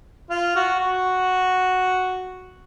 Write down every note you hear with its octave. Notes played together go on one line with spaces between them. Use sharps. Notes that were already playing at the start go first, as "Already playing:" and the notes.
F4
F#4
F#4